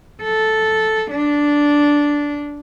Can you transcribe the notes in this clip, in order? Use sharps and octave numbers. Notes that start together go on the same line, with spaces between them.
A4
D4